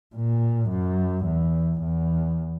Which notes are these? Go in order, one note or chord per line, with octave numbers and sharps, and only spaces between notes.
A#2
F#2
E2
E2